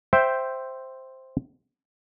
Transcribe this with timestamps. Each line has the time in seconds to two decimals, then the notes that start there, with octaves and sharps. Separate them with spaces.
0.13 C5 E5 G5